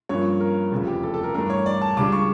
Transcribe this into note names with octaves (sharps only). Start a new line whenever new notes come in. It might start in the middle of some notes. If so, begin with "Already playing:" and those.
G2 F3 A#3 C#4 C#5
A#4
F1 E2 C#3 F3
G4
A4
A4
A#4
G2 E3 A3 D4 A#4
C#5
D5
A5
C#2 C#3 G3 D4 D6
C#6